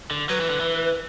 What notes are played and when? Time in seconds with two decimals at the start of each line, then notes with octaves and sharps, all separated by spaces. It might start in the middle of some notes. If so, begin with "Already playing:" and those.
0.11 D3
0.29 F#3 B4
0.40 E3
0.50 D3
0.60 E3